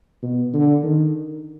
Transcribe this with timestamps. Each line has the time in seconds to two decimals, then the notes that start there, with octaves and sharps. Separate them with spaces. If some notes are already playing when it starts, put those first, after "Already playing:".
0.23 B2
0.53 D3
0.83 D#3